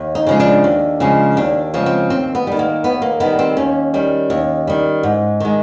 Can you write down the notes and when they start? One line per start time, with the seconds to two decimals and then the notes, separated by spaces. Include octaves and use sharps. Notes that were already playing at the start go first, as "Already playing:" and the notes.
Already playing: D#2
0.15 D#4
0.27 C#3 F3 G#3
0.40 D4
0.64 D#2
1.00 C#3 F3 G#3
1.37 D#2 D4
1.74 C#3 F3 G#3
1.86 C4
2.10 D#2 C4
2.35 B3
2.47 D#3 G3
2.59 A#3
2.84 D#2 B3
3.02 A#3
3.20 D#3 G3 B3
3.39 C4
3.57 D#2 C#4
3.94 D#3 G3
4.30 D#2
4.67 D#3 G3
5.03 G#2
5.40 D#3 G#3